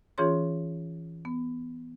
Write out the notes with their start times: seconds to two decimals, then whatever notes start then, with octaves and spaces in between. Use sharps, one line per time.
0.18 E3 C#4 F4 G#4 C#5 C6
1.25 B3